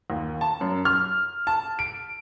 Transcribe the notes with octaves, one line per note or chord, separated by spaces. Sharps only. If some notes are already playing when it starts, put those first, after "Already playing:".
D#2
A5
F#2
F6
A5
D7